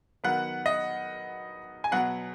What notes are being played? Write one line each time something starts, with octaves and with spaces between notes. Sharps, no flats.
D#3 F#3 B3 F#5
D#5
G#5
B2 F#3 B3 F#5